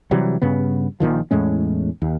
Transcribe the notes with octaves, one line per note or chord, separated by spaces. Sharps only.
C3 E3 F#3 G3
G2 C#3 B3
A#1 A#2 D#3 F3
E2 A2 G#3 C#4
D#2